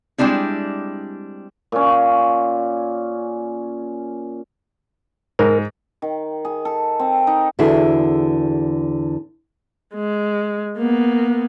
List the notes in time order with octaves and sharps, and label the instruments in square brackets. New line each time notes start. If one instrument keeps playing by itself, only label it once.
[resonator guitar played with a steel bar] G3 G#3 C4 D4 E4
[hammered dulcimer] A#2 C#4
[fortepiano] G#2 [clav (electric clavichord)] A#4
[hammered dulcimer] D#3
G#4
A4
C4
D#4
[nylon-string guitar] E2 D3 E4 F#4 G#4
[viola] G#3
A#3 B3